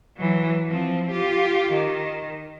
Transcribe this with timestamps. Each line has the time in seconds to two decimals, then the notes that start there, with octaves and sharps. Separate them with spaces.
0.17 E3 F#3
0.69 F3 C4
1.12 F4 G4
1.72 D#3